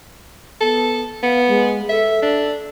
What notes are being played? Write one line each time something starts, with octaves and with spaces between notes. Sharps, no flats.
B3 A4
B3 F5
G#3
A4 E5
D4